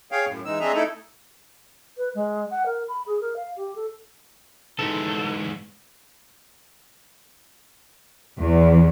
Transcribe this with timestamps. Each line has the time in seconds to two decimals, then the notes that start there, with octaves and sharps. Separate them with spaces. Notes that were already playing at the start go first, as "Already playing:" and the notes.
0.12 G#4 C#5 F5 G5
0.26 F#2 A2
0.45 E3 G#3 D#4 E6
0.60 C4 D4 G#4 D#5 E5 A#5
0.74 A3 D#4 E4 A4
1.97 B4
2.15 G#3
2.51 F#5
2.66 A#4
2.88 B5
3.06 G#4
3.21 A#4
3.36 F5
3.57 G4
3.76 A4
4.79 G#2 E3 A4
8.39 E2